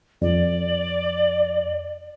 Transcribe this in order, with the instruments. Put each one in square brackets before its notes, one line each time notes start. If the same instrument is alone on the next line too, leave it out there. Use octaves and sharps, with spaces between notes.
[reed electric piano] F2 [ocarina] D5